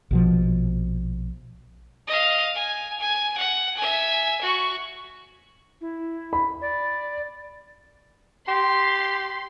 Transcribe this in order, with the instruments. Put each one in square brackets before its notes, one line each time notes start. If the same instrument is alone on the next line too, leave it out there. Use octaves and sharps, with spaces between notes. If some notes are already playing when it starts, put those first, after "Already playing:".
[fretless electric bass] A#1 B2 F3
[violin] D#5 F5
G#5
G#5
F#5
E5 G#5
F#4 C#6
[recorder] E4
[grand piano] B5
[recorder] D5
[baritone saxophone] G4 [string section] C6